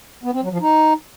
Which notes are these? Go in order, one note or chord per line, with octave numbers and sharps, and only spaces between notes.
B3
C4
F#3
F3
D#4